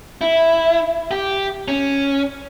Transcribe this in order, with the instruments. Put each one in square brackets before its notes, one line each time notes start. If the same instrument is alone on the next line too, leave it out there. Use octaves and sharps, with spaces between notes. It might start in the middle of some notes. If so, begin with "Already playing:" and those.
[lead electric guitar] E4
G4
C#4